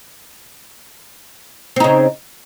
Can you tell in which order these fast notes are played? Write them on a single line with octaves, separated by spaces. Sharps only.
C4 D#4 C#3